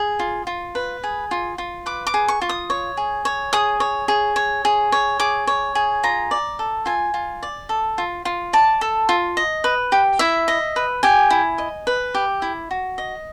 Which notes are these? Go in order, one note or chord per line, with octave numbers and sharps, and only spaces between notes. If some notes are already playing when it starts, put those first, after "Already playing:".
Already playing: G#4
F4
F4
B4
G#4
F4
F4
B4 D6
D6
G#4
C#6
F4
D#6
C#5
G#4
C#5
G#4 D#6
C#5
G#4
C#5
G#4
C#5
G#4 D6
C#5
G#4
F4 A#5
D5
A4
F4 G#5
F4
D5
A4
F4
F4
D5 A5
A4
F4
D#5
B4
G4
E4 E5
D#5
B4
G4 G#5
E4
D#5
B4
G4
E4
F#4
D#5